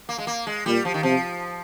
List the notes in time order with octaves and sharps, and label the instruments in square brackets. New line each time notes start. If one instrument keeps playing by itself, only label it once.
[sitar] A#3
G#3
A#3
G#3
[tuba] A#2 [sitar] G3
[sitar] F3
D#3
[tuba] C3 [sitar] F3